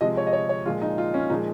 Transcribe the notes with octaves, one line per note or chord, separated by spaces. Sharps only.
C3 F3 G#3 D#5
C#5
D#5
C#5
C#5
A#2 F3 G#3 F4
D#4
F4
C#4
A#2 F3 G#3 D#4